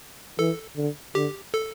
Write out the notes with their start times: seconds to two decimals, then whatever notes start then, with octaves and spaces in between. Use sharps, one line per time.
0.39 E3 A4
0.77 D3
1.15 D3 G4
1.54 A4